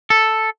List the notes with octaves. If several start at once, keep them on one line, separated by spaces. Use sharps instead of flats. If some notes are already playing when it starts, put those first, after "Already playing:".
A4